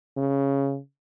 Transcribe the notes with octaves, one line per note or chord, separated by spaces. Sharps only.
C#3